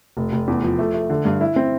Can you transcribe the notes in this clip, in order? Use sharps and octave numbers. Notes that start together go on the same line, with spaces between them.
F1
F1
E2
F3
A3
A3
D3
G2
E4
C4